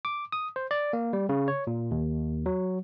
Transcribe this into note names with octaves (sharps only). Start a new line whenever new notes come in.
D6
D#6
C5
D5
A#3
G3
C#3
C#5
A#2
D#2
F#3